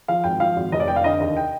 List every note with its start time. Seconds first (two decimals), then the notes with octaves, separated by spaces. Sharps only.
0.08 F3 F5
0.24 G#1 G5
0.40 F3 F5
0.56 G#1
0.72 F1 D#5
0.80 D5
0.88 F1 G5
0.96 F5
1.04 D3 D#5
1.20 D#2 D#5
1.37 G5